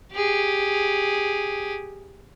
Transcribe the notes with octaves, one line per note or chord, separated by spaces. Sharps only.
G4 G#4